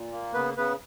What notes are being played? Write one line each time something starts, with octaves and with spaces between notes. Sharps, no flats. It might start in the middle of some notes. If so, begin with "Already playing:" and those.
Already playing: A#2
A#3
C#3 B3 B4
C#3 B3 B4